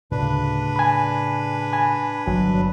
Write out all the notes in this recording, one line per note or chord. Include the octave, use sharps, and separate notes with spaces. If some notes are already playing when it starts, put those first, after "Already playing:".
D2 A2 C#3 D4 B4
G#5 B5
G#5 B5
G1 E3 F#3